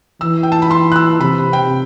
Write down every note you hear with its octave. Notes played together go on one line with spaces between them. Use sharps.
E3 E6
G5
A5
B5
C6
F#6
E6
C3 B5
G5